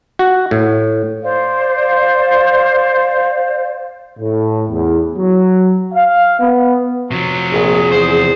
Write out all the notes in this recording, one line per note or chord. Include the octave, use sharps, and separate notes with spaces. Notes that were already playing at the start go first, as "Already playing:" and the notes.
F#4
A2
C5 D5 F5
A2
E2
F#3
F5
B3
C3 F3 F#3
A#1 G#4
E2 C5